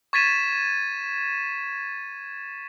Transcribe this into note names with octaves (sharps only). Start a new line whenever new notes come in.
C#6 G#6 A6 B6 D#7 E7